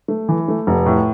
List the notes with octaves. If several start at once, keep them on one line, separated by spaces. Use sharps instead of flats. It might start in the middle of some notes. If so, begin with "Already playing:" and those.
A3
E3
A3
F1
A2